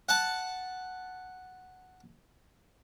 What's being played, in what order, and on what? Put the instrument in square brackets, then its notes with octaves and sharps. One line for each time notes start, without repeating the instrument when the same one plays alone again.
[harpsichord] F#5 A5